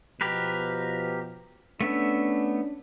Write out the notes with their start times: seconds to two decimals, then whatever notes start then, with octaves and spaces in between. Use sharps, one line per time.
0.21 B2 F3 G4 A#4 B4
1.81 A3 B3 C#4 D4 E5